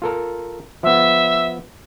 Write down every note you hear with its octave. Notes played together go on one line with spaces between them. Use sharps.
F4 A4 A#4
F3 B3 E5